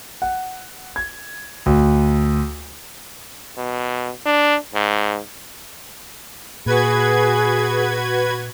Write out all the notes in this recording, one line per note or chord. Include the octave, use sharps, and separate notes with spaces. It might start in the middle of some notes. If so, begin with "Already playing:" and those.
F#5
G#6
D2
B2
D4
G#2
A#2 F#4 G#4 B4 G#6